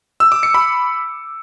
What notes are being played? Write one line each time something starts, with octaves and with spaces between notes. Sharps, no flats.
E6
D6
C#7
B5